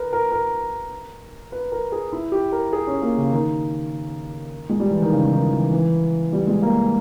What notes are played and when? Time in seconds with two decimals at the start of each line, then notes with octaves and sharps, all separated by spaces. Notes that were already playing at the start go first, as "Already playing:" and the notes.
Already playing: A#4 B4
0.13 A#4
0.32 A#4
1.52 B4
1.72 A#4
1.92 G#4
2.13 E4
2.32 G4
2.52 A#4
2.73 G#4
2.87 C#4
3.02 A#3
3.17 C#3
3.32 D#3
4.69 G#3
4.80 G3
4.91 E3
5.02 D#3
5.13 C#3
5.33 D#3
5.53 E3
5.73 E3
6.33 G3
6.47 G#3
6.62 A#3